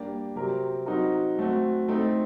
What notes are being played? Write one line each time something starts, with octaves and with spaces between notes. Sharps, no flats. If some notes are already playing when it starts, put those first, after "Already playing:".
Already playing: G3 A#3 D4 G4
C3 F#3 C4 G4 A#4
F#3 C4 D#4 F#4 A#4
F#3 A3 C4 F#4
A3 C4 D#4 A4